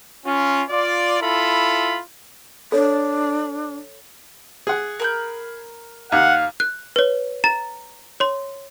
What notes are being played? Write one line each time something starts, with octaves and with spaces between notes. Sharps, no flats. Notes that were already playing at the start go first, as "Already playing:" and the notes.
C#4 F4
F4 D5
E4 F4 A4 B5
D4 A4 C#5
G#4 F#5
A#4 B5 G6
D#2 F5 F#5
F#6
B4 C#5
A#5 A6 E7
C#5 C6